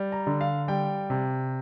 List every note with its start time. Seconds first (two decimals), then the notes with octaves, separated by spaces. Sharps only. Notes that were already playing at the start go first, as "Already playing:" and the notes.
Already playing: G3
0.12 A#5
0.27 D3
0.41 F5
0.68 G3 G5
1.10 C3